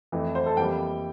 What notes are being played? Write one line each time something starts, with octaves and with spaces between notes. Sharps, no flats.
F2 E3 A3
C5
A4
F2 E3 G3 A#3 G5